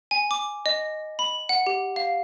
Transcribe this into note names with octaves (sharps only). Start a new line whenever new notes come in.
G#5
D6
D#5
B5
F#5
G4
F5